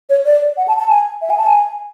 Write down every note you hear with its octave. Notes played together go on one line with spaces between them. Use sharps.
C#5
D5
F#5
A5
A5
G#5
E5
G#5
A5
G#5